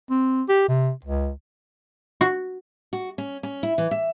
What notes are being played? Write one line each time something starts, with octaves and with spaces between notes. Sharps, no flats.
C4
G4
C3
C#2
F#4
F#4
C#4
C#4
E4
E3
E5